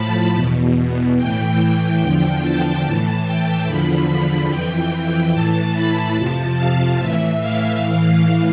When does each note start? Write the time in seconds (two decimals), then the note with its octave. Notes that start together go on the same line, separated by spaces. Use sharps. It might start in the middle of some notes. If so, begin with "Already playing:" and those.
Already playing: A2 F3 A5 B5
0.34 E2 B2
1.17 A2 E3 G5
2.01 E2 D3 F3 G5
2.42 A5
2.83 A2 E3
3.25 G5
3.66 E2 D3 F3 B5
4.08 B5
4.49 F2 E3 G5
5.32 A2 E3 A5
5.74 B5
6.16 F2 C3 F3 A5
6.57 F5
6.98 A2 E3 E5
7.40 F5
7.81 A2 E3 F5